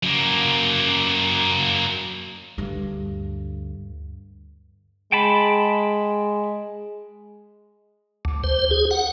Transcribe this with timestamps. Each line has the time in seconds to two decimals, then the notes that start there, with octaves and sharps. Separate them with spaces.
0.03 F#2 A#3
2.58 D2 G2
5.12 G#3 G5 A5 B5
8.25 D2
8.44 C5
8.71 G#4
8.91 F#5